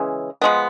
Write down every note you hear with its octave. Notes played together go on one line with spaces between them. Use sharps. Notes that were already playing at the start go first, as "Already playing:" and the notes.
Already playing: C#3 E3 G#3
F3 G#3 B3